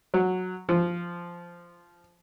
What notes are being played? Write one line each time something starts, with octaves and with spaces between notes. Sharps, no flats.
F#3
F3